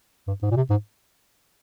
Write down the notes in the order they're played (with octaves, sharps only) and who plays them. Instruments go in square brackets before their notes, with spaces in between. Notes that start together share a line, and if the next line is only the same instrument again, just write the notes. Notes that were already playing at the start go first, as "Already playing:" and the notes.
[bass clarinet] G2
G#2
A#2
C3
G#2